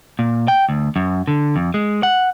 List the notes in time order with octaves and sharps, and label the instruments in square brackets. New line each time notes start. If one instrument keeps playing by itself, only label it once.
[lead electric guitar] A#2
G5
D2
F#2
D3
F2
G#3
F#5